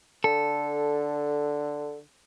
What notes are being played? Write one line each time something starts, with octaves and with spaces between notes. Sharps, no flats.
D3 A4